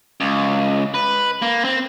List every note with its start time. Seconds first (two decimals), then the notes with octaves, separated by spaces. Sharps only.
0.20 C#2
0.94 B4
1.42 A#3
1.65 C4